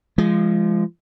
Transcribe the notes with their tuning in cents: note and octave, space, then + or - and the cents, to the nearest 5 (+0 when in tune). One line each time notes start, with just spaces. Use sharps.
F3 -25 G#3 +0